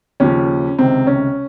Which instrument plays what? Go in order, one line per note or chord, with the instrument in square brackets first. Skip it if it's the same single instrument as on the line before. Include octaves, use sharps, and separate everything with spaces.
[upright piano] D#2 C#3 F3 C#4
C#2 C3 D#3 C4
C#4